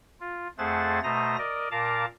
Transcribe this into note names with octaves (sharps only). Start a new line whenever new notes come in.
F4
F2 A3 G#4 C5 F#5 A6
B2 A3 C5 A#5 D#6 A#6
A#4 D5 D#5
A#2 A#4 F5 A5 A#5 D6